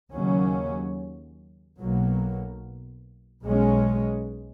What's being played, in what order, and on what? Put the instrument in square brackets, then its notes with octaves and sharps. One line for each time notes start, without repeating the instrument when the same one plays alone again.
[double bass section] D#2 C#3 F#3 C#4
B1 B2 F#3 A#3
B1 B2 G#3 C#4